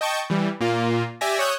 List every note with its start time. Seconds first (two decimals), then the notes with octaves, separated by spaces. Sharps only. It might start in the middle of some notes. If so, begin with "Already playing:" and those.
0.01 D#5 G5 A5 C#6 G6
0.30 E3 G3
0.60 A#2 A#3 F4
1.21 G4 D5 E5 G#5 A#6
1.39 C#5 C#6 D#6 E6 F#6 G6